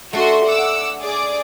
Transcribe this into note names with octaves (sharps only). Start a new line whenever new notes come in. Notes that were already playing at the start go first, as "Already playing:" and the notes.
A3 D4 F#4 C6
F#5 D6 E6
G#4 D5 D6